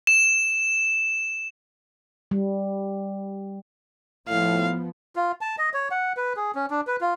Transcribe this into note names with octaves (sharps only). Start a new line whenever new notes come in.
E7
G3
A2 F3 B3 F5
F4
A5
D#5
C#5
F#5
B4
G#4
C#4
D4
B4
F4